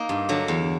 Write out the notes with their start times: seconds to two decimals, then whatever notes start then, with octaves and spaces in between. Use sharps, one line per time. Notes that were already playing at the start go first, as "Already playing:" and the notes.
Already playing: A#3 D#4
0.09 G2
0.29 D3 F#3
0.48 E2